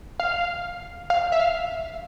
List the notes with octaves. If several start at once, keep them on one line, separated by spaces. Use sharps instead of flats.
F5
F5
E5
F5